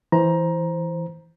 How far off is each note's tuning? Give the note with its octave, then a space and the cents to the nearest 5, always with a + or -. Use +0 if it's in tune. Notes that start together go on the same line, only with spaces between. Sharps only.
E3 +0 C5 +0 A#5 +15